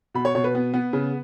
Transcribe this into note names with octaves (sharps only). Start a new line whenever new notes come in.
B2 B5
C#5
B2 C#5
B4
B3
B3
C#3